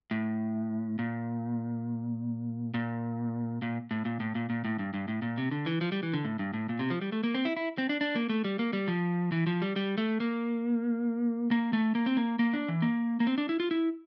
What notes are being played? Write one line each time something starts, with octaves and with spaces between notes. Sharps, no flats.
A2
A#2
A#2
A#2
A2
A#2
A2
A#2
A#2
A2
G2
G2
A2
A#2
C3
D3
E3
F3
G3
E3
D3
A2
G2
A2
A#2
C3
F3
G3
A3
A#3
C4
E4
E4
C4
D4
D4
A#3
A3
G3
A#3
G3
F3
E3
F3
G3
G3
A3
A#3
A#3
A3
A#3
C4
A#3
A#3
D4
E3
A#3
A#3
C4
D4
E4
F4
E4